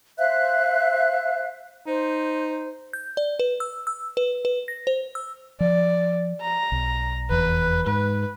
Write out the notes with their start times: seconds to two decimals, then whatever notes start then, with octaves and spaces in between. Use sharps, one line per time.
0.18 C5 E5 F5 F#6
1.86 D#4 C5
2.93 G6
3.17 D5
3.39 B4
3.60 E6
3.87 E6
4.17 B4
4.45 B4
4.68 A#6
4.87 C5
5.15 E6
5.60 F3 D5
6.41 A#5
6.72 B1
7.30 F1 E2 E3 B4
7.86 G#2 B4